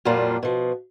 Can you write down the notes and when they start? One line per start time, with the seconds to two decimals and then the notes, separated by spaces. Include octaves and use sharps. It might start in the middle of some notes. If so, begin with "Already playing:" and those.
0.05 F2 A#2 F#3 G3 A#3 F4
0.43 B2 F3